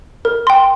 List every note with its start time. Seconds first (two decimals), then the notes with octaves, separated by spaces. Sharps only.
0.25 A#4
0.47 G5 C6